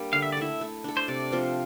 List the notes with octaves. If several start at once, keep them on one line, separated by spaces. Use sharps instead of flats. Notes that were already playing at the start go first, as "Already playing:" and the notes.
Already playing: G3 A#3 D4
D3 F5
E5
D5
A3 E4 E5
A3
D4 A4
C5
C3 D5
F3 C4 F4